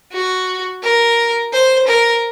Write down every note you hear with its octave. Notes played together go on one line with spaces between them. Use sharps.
F#4
A#4
C5
A#4